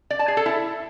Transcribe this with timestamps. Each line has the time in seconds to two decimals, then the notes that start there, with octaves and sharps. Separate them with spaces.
0.10 D5
0.19 A5
0.28 G#4
0.37 A4
0.46 E4